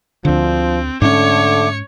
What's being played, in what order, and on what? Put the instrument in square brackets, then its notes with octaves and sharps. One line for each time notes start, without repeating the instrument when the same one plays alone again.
[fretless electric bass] D2 D3 [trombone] F3 [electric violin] C4
[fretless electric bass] G#2 C#4 [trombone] D3 [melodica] A3 D6 [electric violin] C#5 C#7